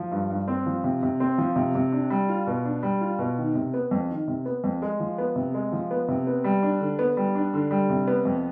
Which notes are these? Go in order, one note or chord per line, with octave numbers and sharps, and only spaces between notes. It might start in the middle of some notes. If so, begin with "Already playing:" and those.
Already playing: F3
G2
G2
C4
F3
C3
C3
C4
F3
C3
C3
D4
G3
F4
B2
D4
G3
F4
B2
D#3
C3
B3
F2
D#3
C3
B3
F2
G#3
F3
B3
C3
G#3
F3
B3
C3
B3
G3
D4
D3
B3
G3
D4
D3
G3
C3
B3
F2